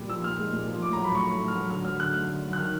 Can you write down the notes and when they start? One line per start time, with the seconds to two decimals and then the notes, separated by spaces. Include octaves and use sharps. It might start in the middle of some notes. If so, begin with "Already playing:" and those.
Already playing: A#2 G3
0.09 F3 E6
0.24 A#2 F6
0.38 G#3
0.53 A#2
0.68 F3
0.82 A2 D6
0.93 F#3 A#5
1.04 B5
1.12 A2 C#6
1.27 A3
1.41 A2
1.48 F6
1.55 F#3
1.70 D3 F6
1.85 F#3 F6
1.99 D3 F#6
2.14 A3
2.29 D3
2.43 F#3
2.53 F#6
2.58 D#3 F6